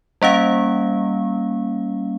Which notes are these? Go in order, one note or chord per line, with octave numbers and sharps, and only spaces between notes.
G3 A#3 C#4 F5